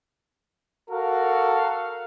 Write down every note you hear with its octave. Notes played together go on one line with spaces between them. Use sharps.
F#4 A4 A#4 F5